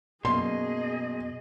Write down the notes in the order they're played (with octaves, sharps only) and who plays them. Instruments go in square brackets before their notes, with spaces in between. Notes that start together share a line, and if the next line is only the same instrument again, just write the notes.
[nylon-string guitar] F#2 A#3 D5 [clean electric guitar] B2 [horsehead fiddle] G#4 D#5 [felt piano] C6